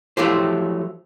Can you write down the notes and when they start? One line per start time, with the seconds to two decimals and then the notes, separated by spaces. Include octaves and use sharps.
0.17 F3 F#3 A3 E4 G4 C5